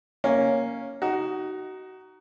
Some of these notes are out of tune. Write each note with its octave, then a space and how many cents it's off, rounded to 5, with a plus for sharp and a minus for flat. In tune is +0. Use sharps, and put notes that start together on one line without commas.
A#3 +0 C#4 +0
D#4 +0 F#4 +25